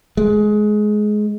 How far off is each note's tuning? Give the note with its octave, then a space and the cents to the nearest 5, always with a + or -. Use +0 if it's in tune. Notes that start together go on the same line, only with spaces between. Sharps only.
G#3 +20